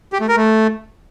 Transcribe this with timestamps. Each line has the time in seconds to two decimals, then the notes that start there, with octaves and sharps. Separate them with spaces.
0.13 G4
0.21 A3
0.28 A#4
0.36 A3